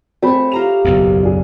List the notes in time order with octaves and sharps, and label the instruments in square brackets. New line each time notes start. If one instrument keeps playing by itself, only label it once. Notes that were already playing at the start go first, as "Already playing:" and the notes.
[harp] A3 C#5 [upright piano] C4 G#4 B5
[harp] F4 A#5 E7 [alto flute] G4 [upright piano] F7
[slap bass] F#1 B1 E2
[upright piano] D4 G#4